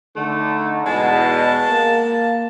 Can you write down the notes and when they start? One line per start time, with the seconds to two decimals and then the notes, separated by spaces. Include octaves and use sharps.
0.16 D3 A3 D#4
0.86 E2 B2 G#3 A5
1.69 A#3